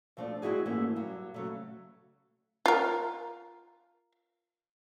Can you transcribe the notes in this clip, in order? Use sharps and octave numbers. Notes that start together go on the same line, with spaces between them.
D2 F3 A3 C4 D4
G#3 C4 E4 F#4 G#4
G#2 E3 A3 A#3 C#4 E4
G2 F#3
C#3 F#3 A3
F4 A#4